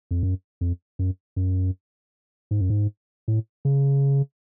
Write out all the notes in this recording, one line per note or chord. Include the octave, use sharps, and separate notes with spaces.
F2
F#2
F2
F#2
F#2
G#2
F#2
G#2
A2
C#3